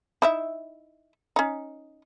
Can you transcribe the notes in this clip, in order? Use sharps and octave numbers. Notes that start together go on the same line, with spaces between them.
D#4 E4 E5
C#4 D#4